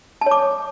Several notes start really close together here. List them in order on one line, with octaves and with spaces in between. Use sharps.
A5 C#5 D6